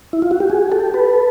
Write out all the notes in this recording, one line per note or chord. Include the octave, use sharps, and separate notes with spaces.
E4
F4
F#4
G4
F#4 G#4
G4 A4
A4 B4